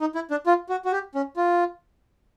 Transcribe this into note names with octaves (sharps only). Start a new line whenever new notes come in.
D#4
E4
D4
F4
F#4
F#4
G4
C#4
F4